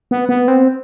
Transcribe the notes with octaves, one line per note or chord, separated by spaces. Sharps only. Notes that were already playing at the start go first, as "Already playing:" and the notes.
B3
B3
C4